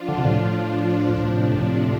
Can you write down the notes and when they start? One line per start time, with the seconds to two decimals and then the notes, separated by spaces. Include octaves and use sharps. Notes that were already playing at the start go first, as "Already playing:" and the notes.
Already playing: F3 D4 F4
0.08 D3
0.18 C3
0.26 A2
1.18 A2 C3 F3 D4
1.55 A2